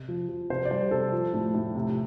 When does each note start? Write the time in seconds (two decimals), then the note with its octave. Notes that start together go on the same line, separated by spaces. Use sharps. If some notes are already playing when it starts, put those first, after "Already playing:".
Already playing: C3
0.08 F3
0.29 F3
0.50 C3 C5
0.65 D5
0.71 G3 C5
0.91 C3 A4
1.12 F3
1.34 A2
1.54 A2
1.75 C3